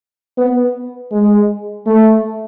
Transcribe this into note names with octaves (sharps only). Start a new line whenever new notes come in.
B3
G#3
A3